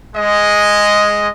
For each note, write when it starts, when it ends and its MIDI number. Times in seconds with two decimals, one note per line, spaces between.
0.16 1.29 56
0.16 1.29 75